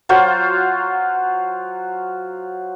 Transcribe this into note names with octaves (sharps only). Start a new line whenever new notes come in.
F#3 F4 F#4 C5